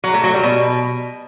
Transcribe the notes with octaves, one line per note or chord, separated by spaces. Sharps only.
F#3
A3
F#3
G3
B2